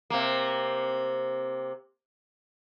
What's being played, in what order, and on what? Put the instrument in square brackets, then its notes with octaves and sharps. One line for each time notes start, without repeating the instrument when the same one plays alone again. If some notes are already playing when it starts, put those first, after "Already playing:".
[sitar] C3 A#3